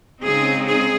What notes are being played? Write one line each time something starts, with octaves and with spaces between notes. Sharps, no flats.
C#3 G#3 C4 D#4 G#4
G#4